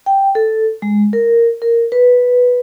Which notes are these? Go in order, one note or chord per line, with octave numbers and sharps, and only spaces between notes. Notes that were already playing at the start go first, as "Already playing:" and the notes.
G5
A4
G#3
A#4
A#4
B4